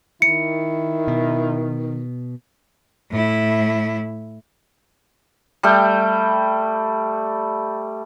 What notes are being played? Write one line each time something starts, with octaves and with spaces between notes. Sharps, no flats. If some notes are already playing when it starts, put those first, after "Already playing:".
D#3 E4 C#7
B2
A2 E4
G3 A3 G5